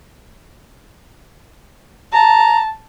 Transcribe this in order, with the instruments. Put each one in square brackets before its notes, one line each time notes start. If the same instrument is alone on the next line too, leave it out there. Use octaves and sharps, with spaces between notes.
[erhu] A5 [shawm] A#5